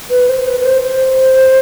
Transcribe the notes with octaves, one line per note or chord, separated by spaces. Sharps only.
B4
C5
B4
B4
C5
C5